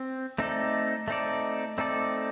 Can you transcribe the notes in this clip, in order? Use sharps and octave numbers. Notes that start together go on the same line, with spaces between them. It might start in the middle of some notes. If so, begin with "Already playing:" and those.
Already playing: C4
A3 C4 D#4 A4 D5
A3 C4 D#4 A4 D5
A3 C4 D#4 A4 D5